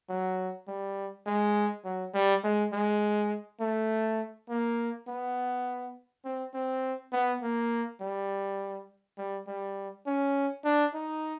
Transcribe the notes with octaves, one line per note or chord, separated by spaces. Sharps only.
F#3
G3
G#3
F#3
G3
G#3
G#3
A3
A#3
B3
C4
C4
B3
A#3
G3
G3
G3
C#4
D4
D#4